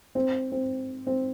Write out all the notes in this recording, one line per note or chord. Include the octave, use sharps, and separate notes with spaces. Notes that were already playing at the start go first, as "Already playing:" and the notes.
C4
C4
C4